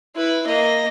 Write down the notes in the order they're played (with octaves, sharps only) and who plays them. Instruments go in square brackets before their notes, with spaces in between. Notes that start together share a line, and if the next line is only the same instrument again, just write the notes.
[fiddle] E4 B4
A#3 D#5